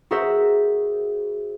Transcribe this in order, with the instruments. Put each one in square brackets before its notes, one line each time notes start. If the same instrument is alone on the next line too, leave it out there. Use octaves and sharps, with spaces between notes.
[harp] F#4 G#4 A#4 C5 E5